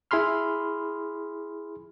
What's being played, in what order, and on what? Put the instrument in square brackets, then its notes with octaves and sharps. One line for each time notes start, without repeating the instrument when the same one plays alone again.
[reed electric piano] E4 G#4 B5 C6 F6